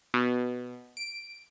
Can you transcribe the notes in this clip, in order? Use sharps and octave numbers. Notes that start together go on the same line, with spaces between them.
B2
D7